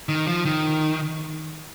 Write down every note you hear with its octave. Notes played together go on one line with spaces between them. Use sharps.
D#3
F3
D#3